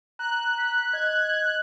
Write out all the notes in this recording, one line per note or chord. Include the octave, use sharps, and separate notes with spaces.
A#5 F#6
B6
D#5 G#6